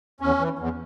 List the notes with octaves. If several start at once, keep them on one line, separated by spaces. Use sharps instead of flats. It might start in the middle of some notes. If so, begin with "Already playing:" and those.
E2 C#4
E3
E2